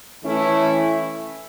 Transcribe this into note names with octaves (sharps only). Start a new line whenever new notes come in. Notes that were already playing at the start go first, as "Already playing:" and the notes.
E3 A3 C#4 E4